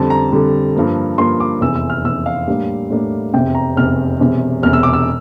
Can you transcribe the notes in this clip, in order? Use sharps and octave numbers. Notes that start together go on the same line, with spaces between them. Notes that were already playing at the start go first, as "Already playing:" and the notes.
Already playing: F2 D3 G3 A5
A#5
F2 D3 G3
G2 F3 A#3
G2 F3 A#3 C6
D6
F1 E2 E3 E6
E6
F6
F1 E2 E3 E6
F5
A2 G3 A#3 D4
A2 G3 A#3 D4
F1 E2 C3 G5
A#5
F1 E2 C3 F6
E1 E2 C3
E1 E2 C3 F6
E6
D6
E6